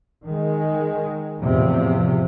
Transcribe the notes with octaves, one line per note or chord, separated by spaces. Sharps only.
D#3 G#3
E2 A2 C3 F3